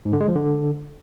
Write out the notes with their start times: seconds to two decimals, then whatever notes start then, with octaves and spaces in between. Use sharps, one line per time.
0.05 G#2
0.13 D3
0.21 G#3
0.28 F3
0.36 D3